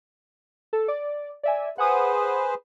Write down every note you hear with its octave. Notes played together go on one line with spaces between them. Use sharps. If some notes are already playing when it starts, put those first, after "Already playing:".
A4
D5
D5 E5 G#5
G#4 B4 C5 F#5 G#5 D#6